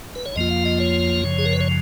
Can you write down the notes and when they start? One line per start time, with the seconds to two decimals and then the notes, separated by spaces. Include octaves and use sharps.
0.15 B4
0.26 C#5
0.36 F2 F3 A#3 F4 D#5
0.51 F5
0.65 D#5
0.80 C#5
1.24 F#2 C#3 F3
1.39 G#4
1.46 A#4
1.53 B4
1.61 C#5